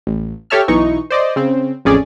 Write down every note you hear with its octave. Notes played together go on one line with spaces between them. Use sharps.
A1
G4 A4 C#5 E5 A5 F6
B1 E3 D#4 C#6
C5 D5 D#5
C#3 C4
A1 F2 C#4 G#4 D5